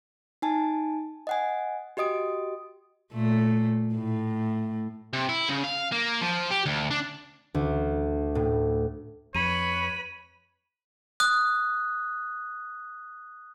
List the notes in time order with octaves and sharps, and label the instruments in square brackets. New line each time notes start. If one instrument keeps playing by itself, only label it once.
[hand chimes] D#4 G#5 A5
D#5 F#5 G#5
F#4 G4 D#5 D#6 D7
[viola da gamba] A#2 A3
A2
[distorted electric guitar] C3
E4
C#3
F5
A#3
F3
G4
D2
D4
[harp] D2
A2
[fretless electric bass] F2 [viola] B4 B5 [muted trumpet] C#5 [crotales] D#7
[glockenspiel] D#6 F#6